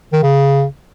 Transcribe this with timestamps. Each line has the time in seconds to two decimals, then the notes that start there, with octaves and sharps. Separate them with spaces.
0.13 D#3
0.23 C#3